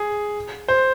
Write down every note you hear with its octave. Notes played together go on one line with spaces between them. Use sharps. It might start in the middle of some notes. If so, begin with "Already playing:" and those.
Already playing: G#4
C5